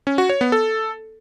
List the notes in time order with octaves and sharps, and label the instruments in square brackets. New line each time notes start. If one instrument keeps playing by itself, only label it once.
[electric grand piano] C#4
F#4
C#5
B3
A4